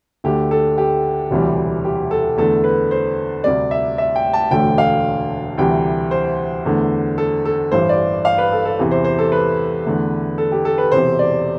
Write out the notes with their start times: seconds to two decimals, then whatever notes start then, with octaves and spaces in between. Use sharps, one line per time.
0.24 D2 D3 A3 G4
0.51 A4
0.78 G4
1.30 E1 D2 C3 E3 G3
1.85 G4
2.11 A4
2.37 E2 D3 A3 A4
2.64 B4
2.91 C5
3.44 D2 C3 G3 D5
3.71 E5
3.98 E5
4.16 G5
4.33 A5
4.51 E1 D2 D3 A3 G5
4.78 F5
5.58 D2 C3 E3 G3 G5
6.11 C5
6.65 E2 D3 A3
7.18 A4
7.45 A4
7.72 A1 G2 E3 C5
7.89 D5
8.25 F5
8.38 B4
8.52 A4
8.65 A4
8.79 E2 C3 E3
8.91 C5
9.05 C5
9.19 A4
9.32 B4
9.85 E2 D3 A3
10.38 A4
10.52 G4
10.65 A4
10.78 B4
10.92 E1 E2 C3 C5
11.19 D5